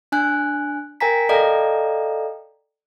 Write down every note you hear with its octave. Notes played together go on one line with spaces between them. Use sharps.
D4 G#5 F#6
A#4 G5 G#5 A#5 B6
A4 D5 D#5 F5 G5 A#5